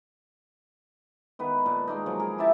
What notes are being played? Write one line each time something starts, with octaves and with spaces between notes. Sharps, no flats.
D#3 B3 B4
A#2 A5
G#3 A#3 D#4
F3 F#3 A#3
G#4 A#4
E4 G4 E5 A5